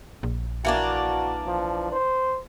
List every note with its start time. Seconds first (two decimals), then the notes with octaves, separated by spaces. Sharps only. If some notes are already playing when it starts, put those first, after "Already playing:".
0.23 A#1
0.65 E3 A#3 D4 F#4
1.47 F3
1.92 C5